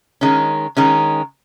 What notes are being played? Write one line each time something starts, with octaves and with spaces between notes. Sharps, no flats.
D#3 G#3 C#4
D#3 G#3 C#4